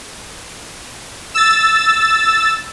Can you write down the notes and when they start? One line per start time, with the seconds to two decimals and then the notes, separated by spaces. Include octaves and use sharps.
1.34 E6 A6